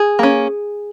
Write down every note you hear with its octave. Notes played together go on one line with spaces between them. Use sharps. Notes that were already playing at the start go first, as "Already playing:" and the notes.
Already playing: G#4
A#3 C#4